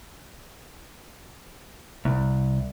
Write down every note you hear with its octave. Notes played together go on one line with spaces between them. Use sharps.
C2